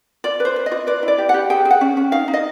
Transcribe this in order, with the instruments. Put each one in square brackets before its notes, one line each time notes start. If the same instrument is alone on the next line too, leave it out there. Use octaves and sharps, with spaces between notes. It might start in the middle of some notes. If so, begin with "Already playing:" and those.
[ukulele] F4 D5
B4
C5
B4
D#5
F4
B4 D5
E4
D5
G4
G4 F#5
G#4 G5
G#4
F#5
C#4
C#4
D#4 F5
D#4
D#5